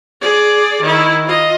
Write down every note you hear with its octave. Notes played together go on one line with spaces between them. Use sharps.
G#4 D5
D#3 E4
F4 D#5